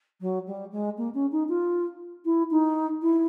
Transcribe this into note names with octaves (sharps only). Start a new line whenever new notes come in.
F#3
G3
G#3
A#3
C#4
D#4
F4
E4
D#4
E4